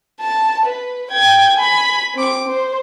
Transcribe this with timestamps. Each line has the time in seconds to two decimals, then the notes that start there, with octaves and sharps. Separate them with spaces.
0.21 A5
0.66 B4
1.11 G5 G#6
1.56 G#5 B5
2.14 C4 D6
2.48 C5